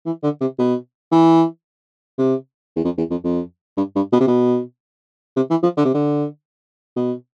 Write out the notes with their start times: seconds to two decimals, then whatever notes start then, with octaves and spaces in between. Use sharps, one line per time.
0.06 E3
0.23 D3
0.41 C3
0.58 B2
1.12 E3
2.18 C3
2.76 E2
2.84 F2
2.98 E2
3.10 F2
3.24 F2
3.77 G2
3.96 G2
4.13 B2
4.20 C3
4.28 B2
5.36 C3
5.50 E3
5.63 F3
5.77 D3
5.85 C3
5.94 D3
6.96 B2